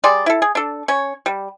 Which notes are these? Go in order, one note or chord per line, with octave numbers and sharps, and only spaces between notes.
G3 G#4 D5 C6
E4 A4
G#4
D4 A4
C#4 C#5
G3